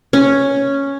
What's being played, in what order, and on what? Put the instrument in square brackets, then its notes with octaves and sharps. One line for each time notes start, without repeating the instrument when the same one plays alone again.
[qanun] C#4